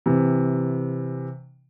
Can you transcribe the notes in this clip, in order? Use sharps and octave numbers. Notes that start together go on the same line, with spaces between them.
C3 E3